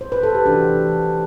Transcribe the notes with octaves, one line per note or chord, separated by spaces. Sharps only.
C5
B4
A4
G4
C3 E3 A3 D4 F#4